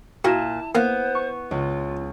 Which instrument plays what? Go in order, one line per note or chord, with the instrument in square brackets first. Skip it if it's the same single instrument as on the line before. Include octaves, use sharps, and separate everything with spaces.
[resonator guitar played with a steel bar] A#2 [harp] E4 G#6 E7 [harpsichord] F#4 [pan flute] A5
[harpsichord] A#3 [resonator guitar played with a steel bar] B3 [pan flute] C5
[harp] C#6
[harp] C#2 [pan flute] F4